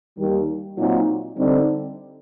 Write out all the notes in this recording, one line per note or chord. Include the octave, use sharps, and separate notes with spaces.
D#2 D#3 G3
A#2 F#3 C4 D#4
D3 G3 C4 D#4